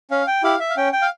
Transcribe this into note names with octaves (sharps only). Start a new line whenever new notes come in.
C#4 F5
G5
E4 G4 F5
E5
F5
C#4 G5
G5
F5